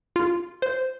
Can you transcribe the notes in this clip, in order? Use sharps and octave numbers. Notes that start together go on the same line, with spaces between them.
F4
C5